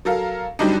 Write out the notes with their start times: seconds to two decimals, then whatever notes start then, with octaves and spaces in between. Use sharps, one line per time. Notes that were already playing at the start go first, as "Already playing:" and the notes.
0.05 F#3 A4 A#4 F5
0.59 G2 F#3 G3 D4 D#4